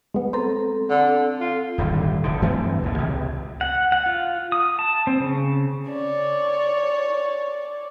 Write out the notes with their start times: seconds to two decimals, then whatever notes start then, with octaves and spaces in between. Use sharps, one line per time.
0.14 G#3 B3
0.33 C4 A4 C5 A#5
0.90 D3
1.41 F4
1.78 D#1 G#1 D3 G3
2.24 F1 D3
2.42 G2 E3 A3 C4
2.82 A#1 D#2 A2
2.98 C#2 C3
3.61 F#5
3.92 F#5
4.06 F4
4.52 D#6
4.79 A5
5.07 C4
5.20 C#3
5.89 C#5 D5